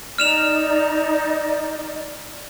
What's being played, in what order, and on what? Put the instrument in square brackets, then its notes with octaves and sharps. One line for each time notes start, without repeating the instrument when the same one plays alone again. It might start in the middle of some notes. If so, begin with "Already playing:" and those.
[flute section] D#4 D5 [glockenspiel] F6 E7 F7